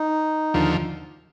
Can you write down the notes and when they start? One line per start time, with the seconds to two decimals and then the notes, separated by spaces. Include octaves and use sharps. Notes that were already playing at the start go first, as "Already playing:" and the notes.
Already playing: D#4
0.54 D#2 D3 F3